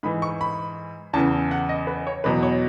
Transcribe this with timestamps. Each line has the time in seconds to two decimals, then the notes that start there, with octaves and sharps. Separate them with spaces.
0.03 G#2 E3 B5
0.22 C#6
0.41 B5
1.13 E2 C#3 E3 A5
1.51 F#5
1.69 D#5
1.87 B4
2.07 C#5
2.24 E2 B2 F#3 B4
2.43 C#5